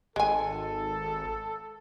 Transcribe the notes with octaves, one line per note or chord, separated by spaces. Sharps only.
G#1 G#3 A4 G#5